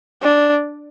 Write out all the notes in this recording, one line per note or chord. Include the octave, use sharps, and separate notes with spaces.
D4